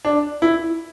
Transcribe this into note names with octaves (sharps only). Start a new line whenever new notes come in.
D4
E4